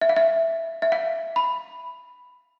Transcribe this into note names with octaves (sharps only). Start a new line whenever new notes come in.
E5
F5
E5
E5
F5
B5